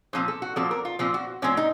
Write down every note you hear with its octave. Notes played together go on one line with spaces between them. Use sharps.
A#2 F3 C4 C5
A4
F#4
A#2 F3 C4 A4
A#4
F4
A#2 F3 C4 F4
F#4
A2 F3 C4 C#4
D#4